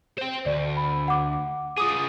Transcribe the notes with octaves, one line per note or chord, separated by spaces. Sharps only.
C5 G5
D2 D5
B5
F#5 D6
F4 G#4 D6 D#6